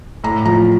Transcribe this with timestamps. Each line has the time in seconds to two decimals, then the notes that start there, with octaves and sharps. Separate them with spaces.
0.24 A2 A#5
0.45 F3 A#5